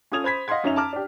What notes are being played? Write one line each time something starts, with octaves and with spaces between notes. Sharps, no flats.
C#4 F4 A4 D#6 G#6 F7
C5 B5 G#6 B6
D#5 F5 F#5 C6 G#6
F#2 C#4 D#4 E5 F7
A5 A#5 D6 F6
D4 G4